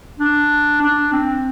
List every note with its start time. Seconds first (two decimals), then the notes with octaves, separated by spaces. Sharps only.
0.19 D4
0.81 D4
1.13 C4